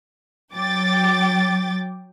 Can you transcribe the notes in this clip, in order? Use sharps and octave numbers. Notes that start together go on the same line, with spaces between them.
F#3 G5 D6 A6